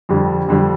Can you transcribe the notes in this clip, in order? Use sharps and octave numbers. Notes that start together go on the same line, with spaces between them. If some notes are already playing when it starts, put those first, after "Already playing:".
F2 D3 G3
F2 D3 G3